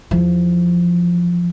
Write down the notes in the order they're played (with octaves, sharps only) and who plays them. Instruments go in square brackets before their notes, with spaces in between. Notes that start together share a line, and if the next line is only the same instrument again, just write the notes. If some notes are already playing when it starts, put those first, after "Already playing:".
[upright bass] E2 F3